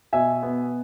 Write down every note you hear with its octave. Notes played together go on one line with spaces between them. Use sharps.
B2 E5 G#5
B3